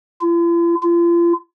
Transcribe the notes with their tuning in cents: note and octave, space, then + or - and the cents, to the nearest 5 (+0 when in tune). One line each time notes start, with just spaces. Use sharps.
F4 -45
F4 -35